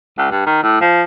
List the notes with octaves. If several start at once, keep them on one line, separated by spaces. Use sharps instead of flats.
C#2
G2
D#3
A2
F3